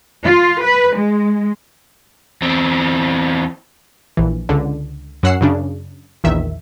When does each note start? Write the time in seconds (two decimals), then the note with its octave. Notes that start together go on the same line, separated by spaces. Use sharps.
0.25 F4
0.64 B4
0.96 G#3
2.42 E2 C4
4.17 A#1 E3
4.49 C#2 D3
5.23 F#2 C#4 F#5 E6 C7
5.41 F#2 C#3 D4
6.24 A#1 E2 D#3 E5